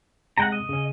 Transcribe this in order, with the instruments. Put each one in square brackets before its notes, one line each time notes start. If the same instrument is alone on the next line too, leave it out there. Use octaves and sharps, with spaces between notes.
[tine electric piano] C3 G#3 [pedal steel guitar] F#5 G5 A#5
[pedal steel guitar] D#5
[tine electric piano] C#3 C#4